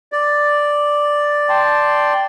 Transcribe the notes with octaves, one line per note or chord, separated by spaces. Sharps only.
D5
G5 A5 C6